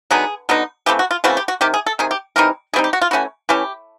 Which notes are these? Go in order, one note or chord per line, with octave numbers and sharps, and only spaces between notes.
D3 F#3 B3 D#4 G#4
D3 F#3 B3 D#4
C#3 E3 A3 C4 G4
F#4
F4
C#3 E3 A3 C4 F#4
G4
F#4
C3 D#3 G4
G#4
A4
C3 D#3 G#4
G4
E3 G3 C4 D#4 A#4
E3 G3 C4 D#4 G#4
G4
F#4
F4
E3 A3 C#4 E4 F#4
E3 A3 C#4 E4 G4